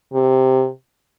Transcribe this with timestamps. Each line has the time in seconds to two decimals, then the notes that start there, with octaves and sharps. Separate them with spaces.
0.14 C3